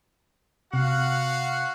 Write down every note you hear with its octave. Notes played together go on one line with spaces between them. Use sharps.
C3 F#4 F5 F#5